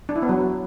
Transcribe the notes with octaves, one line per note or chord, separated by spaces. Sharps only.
D4
E4
B3
F#3